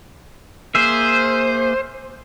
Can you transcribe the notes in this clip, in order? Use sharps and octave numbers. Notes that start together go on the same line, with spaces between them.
A#3 G#4 C5 E5